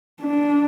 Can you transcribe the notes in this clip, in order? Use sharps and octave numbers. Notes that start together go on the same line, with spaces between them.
D4